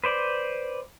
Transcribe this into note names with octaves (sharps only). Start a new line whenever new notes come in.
B4 C5 D5